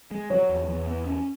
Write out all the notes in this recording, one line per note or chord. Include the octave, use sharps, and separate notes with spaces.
G#3
F#3 C#5
E2
E2
B3
C#4